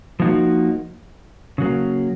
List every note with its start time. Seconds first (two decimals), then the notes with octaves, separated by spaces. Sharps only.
0.20 F3 A#3 D#4 F#4
1.58 C#3 F#3 A#3